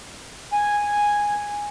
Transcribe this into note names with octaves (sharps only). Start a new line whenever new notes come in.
G#5